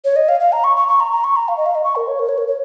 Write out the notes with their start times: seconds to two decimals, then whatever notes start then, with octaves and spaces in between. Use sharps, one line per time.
0.05 C#5
0.16 D#5
0.29 F5
0.40 F5
0.53 A#5
0.64 C#6
0.76 C#6
0.88 C#6
1.00 A#5
1.12 A#5
1.24 C#6
1.36 A#5
1.48 F5
1.57 D#5
1.66 F5
1.75 D#5
1.84 C#6
1.96 A#4
2.08 C#5
2.19 A#4
2.29 C#5
2.38 A#4
2.47 C#5